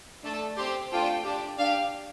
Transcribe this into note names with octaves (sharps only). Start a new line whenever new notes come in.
A3 D4 A4
C4 G4 C6
A3 D4 F4 A4 G5
D4 G4
D4 G4 F5